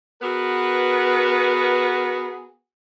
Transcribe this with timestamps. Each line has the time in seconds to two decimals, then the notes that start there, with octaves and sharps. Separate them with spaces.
0.22 B3 F#4 G#4 A#4 B4